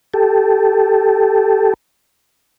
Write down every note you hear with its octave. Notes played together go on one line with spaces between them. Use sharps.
G4 A4